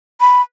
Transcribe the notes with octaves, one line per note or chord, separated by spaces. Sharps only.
B5